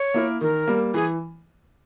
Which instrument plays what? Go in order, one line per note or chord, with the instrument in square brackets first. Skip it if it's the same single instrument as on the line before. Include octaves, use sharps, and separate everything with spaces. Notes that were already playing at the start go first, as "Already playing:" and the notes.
Already playing: [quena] C#5
[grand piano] A#3 E4 A#4
[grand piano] D#3 [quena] A#4
[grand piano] G3 A#3
[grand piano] E3 [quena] G#4